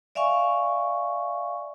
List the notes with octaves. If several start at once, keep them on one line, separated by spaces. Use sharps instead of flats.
D5 E5 F5 G#5 C#6